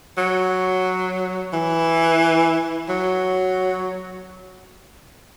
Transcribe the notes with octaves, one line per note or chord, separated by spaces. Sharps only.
F#3
E3
F#3